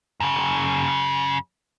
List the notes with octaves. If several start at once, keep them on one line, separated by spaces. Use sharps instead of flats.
F#2 C#3